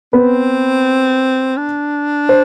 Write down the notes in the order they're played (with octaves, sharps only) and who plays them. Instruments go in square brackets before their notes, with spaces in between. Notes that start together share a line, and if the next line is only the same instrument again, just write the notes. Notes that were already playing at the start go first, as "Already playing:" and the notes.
[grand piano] B3 B4 [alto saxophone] C4
[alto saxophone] D4
[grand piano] C5